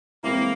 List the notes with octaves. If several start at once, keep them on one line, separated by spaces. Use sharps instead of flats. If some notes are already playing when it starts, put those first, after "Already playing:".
E3 G#3 A#3 C4 E4